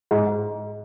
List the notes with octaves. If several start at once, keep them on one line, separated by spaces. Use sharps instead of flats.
G#2